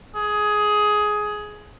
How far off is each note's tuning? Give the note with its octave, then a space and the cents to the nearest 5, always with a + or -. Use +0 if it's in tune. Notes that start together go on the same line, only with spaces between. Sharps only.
G#4 +15